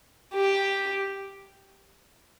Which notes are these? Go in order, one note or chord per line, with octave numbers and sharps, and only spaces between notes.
G4